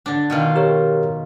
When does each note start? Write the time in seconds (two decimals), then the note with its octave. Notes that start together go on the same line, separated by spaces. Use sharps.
0.06 D3 D4
0.30 B2 D#3 F4
0.56 G4 A#4 C#5